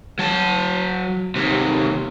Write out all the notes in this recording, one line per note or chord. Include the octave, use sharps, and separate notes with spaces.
F#3 A5
D#2 C3